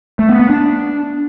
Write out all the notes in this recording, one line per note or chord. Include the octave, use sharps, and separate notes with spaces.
A3
B3
B3
D4